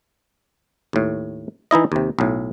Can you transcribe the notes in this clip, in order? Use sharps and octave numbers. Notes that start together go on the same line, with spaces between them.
D#2 A2
E3 D#4 E4 D#5
D#2 C3
B1 A2